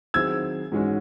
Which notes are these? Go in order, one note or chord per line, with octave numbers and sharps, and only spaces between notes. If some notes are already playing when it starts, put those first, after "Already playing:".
D#3 F#3 C4 E4 G#4 E6 G#6
G#2 E3 G#3 C#4 F#4